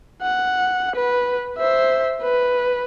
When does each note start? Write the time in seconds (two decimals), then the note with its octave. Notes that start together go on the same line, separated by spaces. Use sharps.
0.22 F#5
0.96 B4
1.58 C5 E5
2.22 B4